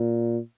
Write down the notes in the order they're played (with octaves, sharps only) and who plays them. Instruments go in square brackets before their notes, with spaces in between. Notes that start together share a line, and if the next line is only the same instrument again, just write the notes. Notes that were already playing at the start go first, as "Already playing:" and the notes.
Already playing: [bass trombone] A#2